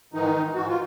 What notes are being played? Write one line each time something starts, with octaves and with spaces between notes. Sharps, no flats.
G#2 D#3 E3 D#4
G#2 E3 F#4
F4